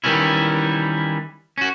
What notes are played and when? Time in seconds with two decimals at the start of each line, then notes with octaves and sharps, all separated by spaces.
0.04 D#3 E3 G3 C#4 E4
1.58 C#4 F#4